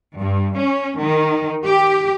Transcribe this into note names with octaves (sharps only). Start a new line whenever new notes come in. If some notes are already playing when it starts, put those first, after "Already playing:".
G2
C#4
D#3
G4